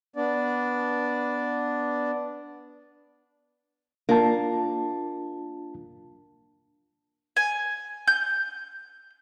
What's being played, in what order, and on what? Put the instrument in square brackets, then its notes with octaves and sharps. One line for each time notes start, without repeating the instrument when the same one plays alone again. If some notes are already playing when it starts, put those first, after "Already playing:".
[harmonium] B3 D4 D5
[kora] A#3 [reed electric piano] D4 F4 A5
[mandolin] G#5
G6